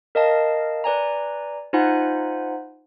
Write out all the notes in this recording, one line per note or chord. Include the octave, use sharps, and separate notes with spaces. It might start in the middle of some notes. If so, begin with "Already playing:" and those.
A#4 D#5 F5 A5
B4 D5 G#5 A#5
D#4 F4 C5 F#5 G#5 B5